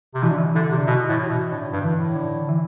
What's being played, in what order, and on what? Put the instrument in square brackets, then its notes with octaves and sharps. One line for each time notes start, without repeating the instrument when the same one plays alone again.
[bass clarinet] C3
[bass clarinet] B2 [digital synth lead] E3
[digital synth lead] D3
E3
[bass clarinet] D3 [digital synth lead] E3
[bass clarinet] C3
[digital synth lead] D3
[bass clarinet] B2 [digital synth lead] E3
[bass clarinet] A2 [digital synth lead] E3
[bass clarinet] B2 [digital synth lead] E3
[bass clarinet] A2 [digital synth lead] D3
[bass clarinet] G2
[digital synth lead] E3
[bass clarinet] A2
[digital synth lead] D3
E3